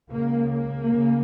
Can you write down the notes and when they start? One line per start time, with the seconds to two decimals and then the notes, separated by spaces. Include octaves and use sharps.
0.11 C#2 C#3 A#3
0.51 A#3
0.90 C#3